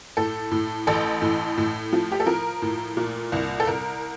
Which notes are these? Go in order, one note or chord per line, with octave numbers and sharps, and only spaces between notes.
A2 A4
A2
A1 A4
A2
A2
F3
G4
A4
F3 A#4
A2
A#2
C2
A4
C2 A#4